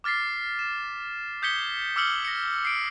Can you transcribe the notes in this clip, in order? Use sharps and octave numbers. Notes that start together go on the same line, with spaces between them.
D6 F6 A6 B6 C7
E7
D#6 G6 G#6 B6 C#7 G7
D6 E6 F6 C#7 F#7 G7
A#6 C#7
C7 D7